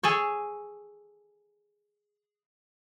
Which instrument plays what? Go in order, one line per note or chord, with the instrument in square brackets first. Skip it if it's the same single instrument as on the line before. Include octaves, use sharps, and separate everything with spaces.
[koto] G#4 A4 C#5